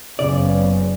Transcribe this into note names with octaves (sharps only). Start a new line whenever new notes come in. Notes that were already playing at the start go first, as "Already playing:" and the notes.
F#1 C#3 B3 D5